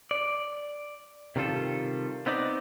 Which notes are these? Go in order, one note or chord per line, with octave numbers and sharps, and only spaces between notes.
D5
C3 D#3 G3 F4 A4
B3 C4 D#4 D5